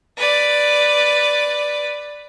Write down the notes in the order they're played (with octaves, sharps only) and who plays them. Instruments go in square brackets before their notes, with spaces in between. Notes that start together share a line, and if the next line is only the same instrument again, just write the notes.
[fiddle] B4 D5